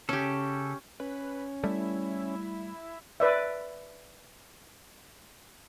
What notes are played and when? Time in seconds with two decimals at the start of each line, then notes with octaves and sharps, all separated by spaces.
0.09 C#3 C#4 G4 A4
1.00 C#4 B4
1.64 G3 A3 E4
3.20 B4 D5 E5